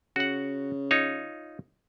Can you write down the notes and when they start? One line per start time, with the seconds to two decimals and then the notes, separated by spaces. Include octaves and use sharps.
0.16 C#3 F#4 F#5
0.91 D#4 F4 C#5